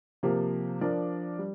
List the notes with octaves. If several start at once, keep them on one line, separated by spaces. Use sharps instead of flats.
C3 F3 A#3 G4
F3 D4 A#4 D5
G3